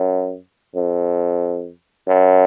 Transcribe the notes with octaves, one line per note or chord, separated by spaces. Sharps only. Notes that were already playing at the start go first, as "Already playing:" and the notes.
Already playing: F#2
F2
F#2